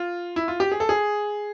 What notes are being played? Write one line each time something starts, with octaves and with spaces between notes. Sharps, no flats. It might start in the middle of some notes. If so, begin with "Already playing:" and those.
Already playing: F4
E4
F4
G4
G#4
A4
G#4